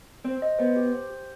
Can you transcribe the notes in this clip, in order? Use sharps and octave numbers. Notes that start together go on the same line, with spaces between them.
C4 C5
D#5
B3 C5
G4
C5
G4